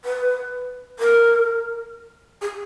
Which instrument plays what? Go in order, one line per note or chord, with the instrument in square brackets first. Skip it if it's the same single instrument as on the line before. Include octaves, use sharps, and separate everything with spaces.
[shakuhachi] B4
A#4
G#4